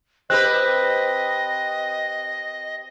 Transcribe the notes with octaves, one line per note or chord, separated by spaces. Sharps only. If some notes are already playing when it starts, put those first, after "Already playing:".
C4 G4 B4 D#5 F#6